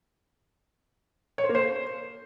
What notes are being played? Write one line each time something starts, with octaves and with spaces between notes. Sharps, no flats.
C#5
C5
A#3
C5